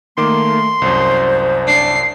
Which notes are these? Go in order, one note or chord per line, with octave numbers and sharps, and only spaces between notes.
D#3 A3 A#3 C6 D6
C2 F#2 C5
D4 C7